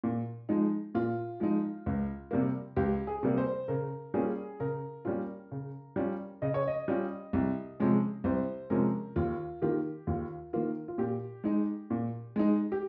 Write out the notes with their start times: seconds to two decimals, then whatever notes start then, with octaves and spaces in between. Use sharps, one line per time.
0.04 A#2
0.49 F3 G#3 D#4
0.95 A#2 F4
1.40 F3 G#3 D#4
1.86 C#2
2.31 C3 G3 A#3
2.76 C#2 G4
3.07 G#4
3.23 C3 G3 A#3
3.37 C5
3.68 C#3 A#4
4.14 G3 A#3 C#4 F4 G#4
4.60 C#3 A#4
5.05 G3 A#3 C#4 F4
5.51 C#3
5.96 G3 C#4 F4
6.42 C#3 D#5
6.54 C#5
6.67 D#5
6.88 G3 C#4 F4
7.33 C2
7.80 C3 F3 G#3 C#4
8.24 C2 C5
8.70 C3 F3 G#3 C#4 A#4
9.16 D#2 F4
9.62 D#3 A#3 F4 G4
10.07 D#2 F4
10.53 D#3 A#3 F4
10.88 F4
10.98 A#2 G4
11.44 G#3 D#4
11.90 A#2
12.36 G#3 D#4
12.72 G4